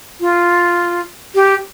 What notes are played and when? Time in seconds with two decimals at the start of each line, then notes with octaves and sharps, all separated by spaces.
0.20 F4
1.35 G4